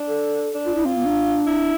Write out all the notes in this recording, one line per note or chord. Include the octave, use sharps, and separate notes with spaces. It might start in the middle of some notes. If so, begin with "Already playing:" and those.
Already playing: D4
A4
D4
F4
E4
C4 F4
B3
D4
E4